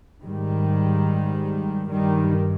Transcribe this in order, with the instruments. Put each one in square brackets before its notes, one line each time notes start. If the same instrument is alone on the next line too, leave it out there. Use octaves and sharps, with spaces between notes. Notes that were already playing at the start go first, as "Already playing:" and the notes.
[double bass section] G#2 D#3 G3
G2 D#3 G3